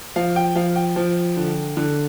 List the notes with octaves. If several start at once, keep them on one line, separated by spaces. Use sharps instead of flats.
F3 F5
G5
F3 F5
G5
F3
D3
D3